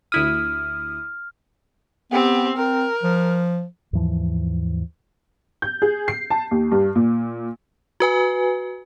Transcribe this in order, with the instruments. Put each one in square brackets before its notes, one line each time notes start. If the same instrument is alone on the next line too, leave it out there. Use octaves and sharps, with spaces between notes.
[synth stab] D2 E4 D#6 [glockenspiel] F6
[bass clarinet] B3 [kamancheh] C4 G4
[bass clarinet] C4 [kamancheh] A#4
[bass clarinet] F3
[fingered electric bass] D#2 G#2 E3 F3
[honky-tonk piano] G6
G#4
C7
A5
D#2
G2
A#2
[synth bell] F#4 B4 G#5